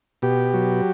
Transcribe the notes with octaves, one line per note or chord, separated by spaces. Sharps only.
B2 G4
F#3